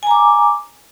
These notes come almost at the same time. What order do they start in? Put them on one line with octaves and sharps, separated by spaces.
G#5 A#5 D6